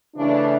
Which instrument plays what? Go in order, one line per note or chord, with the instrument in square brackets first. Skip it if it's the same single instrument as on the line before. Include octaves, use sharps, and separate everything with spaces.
[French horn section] C#3 E3 A3 D4